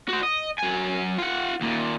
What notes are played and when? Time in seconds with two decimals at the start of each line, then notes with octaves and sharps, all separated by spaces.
0.09 F#4 C5
0.23 D#5
0.58 F#3 G#5
1.18 F4 F#5
1.61 D#2 A#2